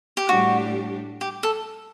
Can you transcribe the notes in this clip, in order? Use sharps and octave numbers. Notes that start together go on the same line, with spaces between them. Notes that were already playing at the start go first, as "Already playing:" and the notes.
G4
A2 G3 D4 F#4 G4
G4
A4